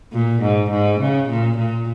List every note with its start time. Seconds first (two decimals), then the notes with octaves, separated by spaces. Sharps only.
0.13 A#2
0.42 G#2
0.71 G#2
1.00 C#3
1.29 A#2
1.58 A#2